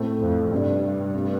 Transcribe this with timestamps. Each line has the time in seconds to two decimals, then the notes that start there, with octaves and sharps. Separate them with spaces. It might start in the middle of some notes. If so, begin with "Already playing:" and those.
Already playing: A2 A3 C4
0.21 F2
0.52 G2 C3 G3 D4
1.13 C3 A3 D4